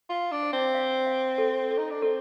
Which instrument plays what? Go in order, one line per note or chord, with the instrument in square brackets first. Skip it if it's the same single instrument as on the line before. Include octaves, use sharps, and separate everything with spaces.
[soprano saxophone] F4 [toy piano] F5
[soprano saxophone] D4
[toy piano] C5
[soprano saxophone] C4
[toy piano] F5
F5
A4
A4
[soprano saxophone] D#4
D4
[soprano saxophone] C4 [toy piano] A4